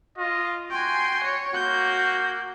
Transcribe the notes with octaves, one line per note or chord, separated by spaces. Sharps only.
F4 D#5
F#4 G5 G#5 C6
C#5
A#3 F#4 G6